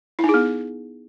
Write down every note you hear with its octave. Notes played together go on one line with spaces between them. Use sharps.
E4
D#4
G#4
B3